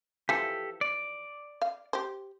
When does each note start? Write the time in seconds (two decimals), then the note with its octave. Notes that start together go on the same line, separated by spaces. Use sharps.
0.29 E3 F3 G4 A4
0.81 D5
1.62 F5
1.93 G4 C5